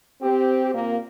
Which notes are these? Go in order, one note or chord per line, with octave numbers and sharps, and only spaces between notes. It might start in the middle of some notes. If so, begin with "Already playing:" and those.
C4 G4
A#2 A#3